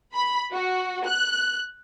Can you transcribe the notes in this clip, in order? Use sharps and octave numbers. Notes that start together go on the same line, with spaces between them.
B5
F#4
F#6